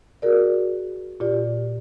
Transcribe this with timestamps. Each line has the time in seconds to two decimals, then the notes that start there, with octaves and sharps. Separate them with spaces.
0.22 F#4 G#4 A#4 D5
1.20 A#2 F4 G4 D5